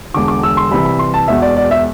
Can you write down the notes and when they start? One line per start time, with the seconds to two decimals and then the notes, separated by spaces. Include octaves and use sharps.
0.14 E1 E2 D3 D6
0.28 D6
0.43 E6
0.57 C6
0.71 C2 C3 E3 B5
0.85 B5
0.99 C6
1.14 A5
1.28 E1 E2 B2 E5
1.42 D5
1.56 D5
1.71 E5